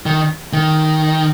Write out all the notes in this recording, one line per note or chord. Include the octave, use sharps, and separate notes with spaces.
D#3
D#3